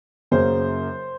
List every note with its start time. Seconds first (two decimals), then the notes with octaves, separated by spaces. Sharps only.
0.31 F#2 C#3 F#3 A#3 C5